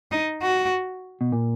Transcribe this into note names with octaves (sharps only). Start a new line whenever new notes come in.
D#4
F#4
B2
A#2